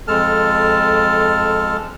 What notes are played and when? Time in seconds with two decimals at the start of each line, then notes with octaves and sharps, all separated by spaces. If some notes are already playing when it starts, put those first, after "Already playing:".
0.08 F2 G#3 A4 A5 F6